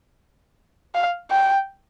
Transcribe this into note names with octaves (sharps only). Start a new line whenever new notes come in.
F5
G5